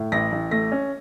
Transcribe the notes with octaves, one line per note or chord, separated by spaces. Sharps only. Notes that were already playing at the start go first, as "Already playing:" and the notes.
Already playing: A2
A1 A#6
A1
A3 A#6
C#4